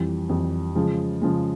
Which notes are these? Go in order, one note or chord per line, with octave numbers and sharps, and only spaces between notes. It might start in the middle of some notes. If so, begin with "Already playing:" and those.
Already playing: F2 E3 G3
F2 E3 G3
C#3 F3 G#3
C#3 F3 G#3